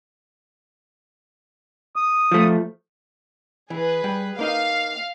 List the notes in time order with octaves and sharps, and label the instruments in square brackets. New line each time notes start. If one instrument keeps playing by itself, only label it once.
[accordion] D#6
[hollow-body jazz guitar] F3 A3
[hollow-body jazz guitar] E3 [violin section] G#4 B4
[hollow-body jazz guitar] G3
[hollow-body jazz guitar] A#3 D#4 D#5 [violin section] F5